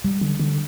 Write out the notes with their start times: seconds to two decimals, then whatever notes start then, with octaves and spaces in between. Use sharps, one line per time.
0.04 G3
0.21 D3
0.40 D3